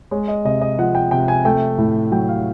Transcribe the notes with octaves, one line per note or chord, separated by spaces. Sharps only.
G#3 C#5
D#5
C3 D#5
D#5
F3 F#5
G5
C3 G5
G#5
A3 G5
A2
F#3 G5
F5